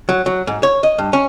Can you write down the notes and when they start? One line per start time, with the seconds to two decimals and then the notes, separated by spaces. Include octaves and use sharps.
0.09 F#3
0.26 F#3
0.47 G#2
0.63 C#5
0.83 D#5
0.98 G2
1.13 C#4